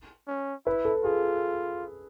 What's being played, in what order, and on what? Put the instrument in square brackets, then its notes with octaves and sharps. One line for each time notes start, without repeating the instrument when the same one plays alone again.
[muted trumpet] C#4
[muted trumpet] E4 [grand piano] B4
[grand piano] A4
[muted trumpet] F4 [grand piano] G#4